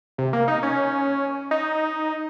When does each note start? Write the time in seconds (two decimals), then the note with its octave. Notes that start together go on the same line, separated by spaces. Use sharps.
0.18 C3
0.33 A#3
0.48 D#4
0.63 C#4
1.51 D#4